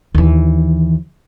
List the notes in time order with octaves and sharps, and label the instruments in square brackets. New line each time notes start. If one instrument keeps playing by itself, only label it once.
[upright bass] D#2 E3